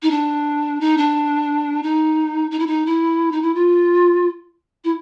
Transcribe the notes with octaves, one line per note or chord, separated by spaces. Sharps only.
D#4
D4
D#4
D4
D#4
D#4
E4
D#4
E4
D#4
E4
F4
E4